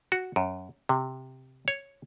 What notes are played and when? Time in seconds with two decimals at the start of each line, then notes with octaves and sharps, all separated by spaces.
0.12 F#4
0.36 F#2
0.89 C3
1.68 C#5